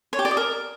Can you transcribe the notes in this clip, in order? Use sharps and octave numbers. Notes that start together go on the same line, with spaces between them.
C#5
G4
D5
D#5
A#4